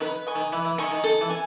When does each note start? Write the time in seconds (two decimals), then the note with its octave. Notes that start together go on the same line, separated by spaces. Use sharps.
0.01 D#3 B4
0.27 D#5 G#5 C#6
0.36 D#3
0.52 E3 B4
0.65 E3
0.78 D#3 D#5 G#5 C#6
0.92 D#3
1.04 D#3 A4
1.21 E3
1.30 G#5